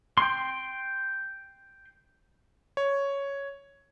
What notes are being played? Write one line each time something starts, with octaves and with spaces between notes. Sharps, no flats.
G5 C6
C#5